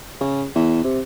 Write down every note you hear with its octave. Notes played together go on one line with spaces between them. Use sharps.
C#3
E2
C3